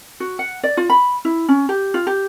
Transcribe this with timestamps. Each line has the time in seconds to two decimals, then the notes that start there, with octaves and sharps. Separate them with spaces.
0.20 F#4
0.39 F#5
0.64 D5
0.77 F4
0.90 B5
1.25 E4
1.49 C#4
1.69 G4
1.94 F4
2.07 G4